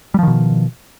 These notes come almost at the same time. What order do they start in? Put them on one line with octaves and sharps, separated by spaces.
G3 F3 D#3 B2